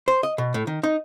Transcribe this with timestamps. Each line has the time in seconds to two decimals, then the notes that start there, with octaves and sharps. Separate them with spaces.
0.08 C5
0.23 D#5
0.38 B2
0.54 A2
0.67 D#3
0.83 D#4